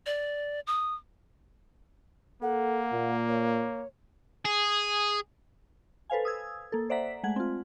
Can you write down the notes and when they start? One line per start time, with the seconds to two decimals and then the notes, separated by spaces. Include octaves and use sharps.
0.06 D5
0.67 D#6
2.42 A#3 A4 F#5
2.93 A#2
3.29 C#5
4.45 G#4
6.10 A4 B4 C5 F5 G#5
6.25 D#6 E6 G#6
6.72 A#3 A4
6.90 C5 D5 E5 F#5 A#5 B6
7.23 G#3 A3 F#5 G#6
7.36 C4 F4